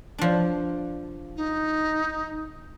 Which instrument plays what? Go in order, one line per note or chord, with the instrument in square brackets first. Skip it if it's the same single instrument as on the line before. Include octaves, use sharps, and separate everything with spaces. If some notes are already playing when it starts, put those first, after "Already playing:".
[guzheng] F3 D4
[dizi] D#4